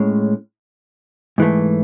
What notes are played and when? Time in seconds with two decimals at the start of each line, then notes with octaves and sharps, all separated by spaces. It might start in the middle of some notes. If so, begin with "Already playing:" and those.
Already playing: A2 G#3 C#4
1.38 G#2 E3 A3